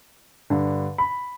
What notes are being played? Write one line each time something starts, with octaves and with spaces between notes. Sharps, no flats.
G2 D3
B5